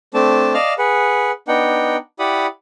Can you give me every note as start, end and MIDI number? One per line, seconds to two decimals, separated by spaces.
0.14 0.54 57
0.14 0.54 60
0.14 0.54 62
0.14 0.54 81
0.54 0.73 74
0.54 0.73 75
0.54 0.73 77
0.54 0.73 81
0.54 0.73 89
0.78 1.31 68
0.78 1.31 71
0.78 1.31 78
1.48 1.97 59
1.48 1.97 62
1.48 1.97 63
1.48 1.97 78
1.48 1.97 79
2.19 2.47 64
2.19 2.47 67
2.19 2.47 74
2.19 2.47 78
2.19 2.47 83
2.19 2.47 87